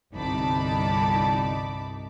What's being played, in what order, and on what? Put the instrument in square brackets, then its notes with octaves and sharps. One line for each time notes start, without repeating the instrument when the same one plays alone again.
[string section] G1 C2 D#4 A5 B5 D6